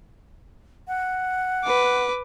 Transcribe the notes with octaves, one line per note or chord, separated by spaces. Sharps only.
F#5
B4 D6